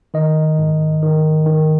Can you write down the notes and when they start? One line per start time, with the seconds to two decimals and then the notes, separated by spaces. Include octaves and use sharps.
0.14 D#3 D#5
0.59 G#2
1.03 D#3
1.46 D#3